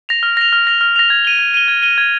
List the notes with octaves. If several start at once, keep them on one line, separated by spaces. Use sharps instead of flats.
A#6 F7
F6
A#6 F7
F6
A#6 F7
F6
A#6 F7
G#6
D#7 G7
G#6
D#7 G7
G#6
D#7 G7
G#6